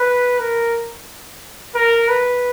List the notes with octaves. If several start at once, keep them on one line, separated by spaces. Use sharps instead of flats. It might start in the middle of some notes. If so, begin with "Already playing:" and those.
Already playing: B4
A#4
A#4
B4